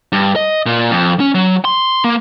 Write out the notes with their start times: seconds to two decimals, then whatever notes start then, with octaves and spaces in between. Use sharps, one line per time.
0.12 G2
0.36 D#5
0.66 A#2
0.91 F2
1.20 C#4
1.35 F#3
1.65 C6
2.04 A#3